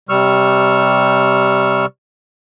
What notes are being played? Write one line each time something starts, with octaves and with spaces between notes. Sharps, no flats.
C3 G3 C#6 E6 F6